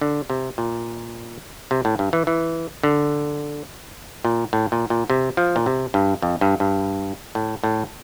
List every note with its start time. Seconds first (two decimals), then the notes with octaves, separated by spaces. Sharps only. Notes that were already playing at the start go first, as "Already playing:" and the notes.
0.01 D3
0.30 C3
0.58 A#2
1.71 C3
1.85 A2
1.99 G2
2.13 E3
2.27 E3
2.83 D3
4.25 A#2
4.53 A2
4.72 A#2
4.90 A#2
5.10 C3
5.37 F3
5.56 A#2
5.66 C3
5.94 G2
6.22 F2
6.41 G2
6.60 G2
7.35 A2
7.64 A2